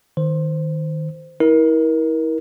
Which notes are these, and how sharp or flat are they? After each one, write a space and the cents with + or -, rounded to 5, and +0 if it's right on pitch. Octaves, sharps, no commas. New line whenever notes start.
D#3 +0 C5 -10
E4 -35 A#4 +25